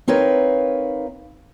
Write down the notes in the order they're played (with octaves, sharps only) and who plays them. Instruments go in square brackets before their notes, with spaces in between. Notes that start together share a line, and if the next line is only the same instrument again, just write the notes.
[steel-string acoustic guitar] C4 D#4 A#4 B4 C#5 F5